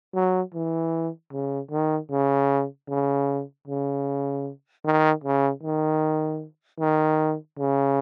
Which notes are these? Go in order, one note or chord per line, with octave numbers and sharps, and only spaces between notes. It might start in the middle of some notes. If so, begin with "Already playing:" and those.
F#3
E3
C#3
D#3
C#3
C#3
C#3
D#3
C#3
D#3
D#3
C#3